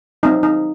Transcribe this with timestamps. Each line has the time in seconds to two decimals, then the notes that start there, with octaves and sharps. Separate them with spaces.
0.23 F#3 C4 D#4
0.43 D#4